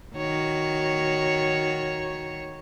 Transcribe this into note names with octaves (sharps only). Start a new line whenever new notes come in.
D#3 F#4 C#5